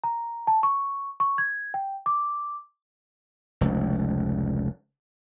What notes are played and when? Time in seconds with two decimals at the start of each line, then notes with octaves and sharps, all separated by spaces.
0.04 A#5
0.47 A5
0.63 C#6
1.20 C#6
1.38 G#6
1.74 G5
2.06 D6
3.61 F1 C#2